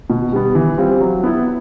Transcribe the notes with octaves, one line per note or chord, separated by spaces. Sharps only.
B2
G3 B3
E3
G3 C4 F4
F#3
B3 E4